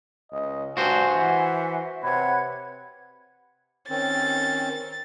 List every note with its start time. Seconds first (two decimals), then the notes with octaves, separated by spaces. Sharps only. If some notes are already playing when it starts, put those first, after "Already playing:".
0.32 C#2 D#5
0.77 G2 F#4 C5 G#5
1.15 E3 E5 F#5
2.03 C3 B4 C#5 F#5 G#6
3.90 D#3 C4 C#4 A6